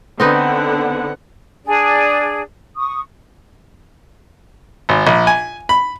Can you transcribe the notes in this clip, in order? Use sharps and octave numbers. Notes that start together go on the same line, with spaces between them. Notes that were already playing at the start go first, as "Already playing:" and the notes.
D3 B3 C4 D#4 B4 F#5
D4 G#4 D5
C#6 D#6
G#1
A#1
G#5
B5